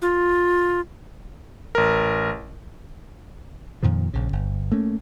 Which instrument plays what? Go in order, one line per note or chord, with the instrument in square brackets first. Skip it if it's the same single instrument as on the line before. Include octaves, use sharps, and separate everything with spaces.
[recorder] F4
[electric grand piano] A1 A#4
[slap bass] F2 A#2 D#3 F3
A#1 C#3
G1
A3 A#3 C#4